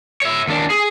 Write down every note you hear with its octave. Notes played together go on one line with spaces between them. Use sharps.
C#5 E5
D#2 D4
G#4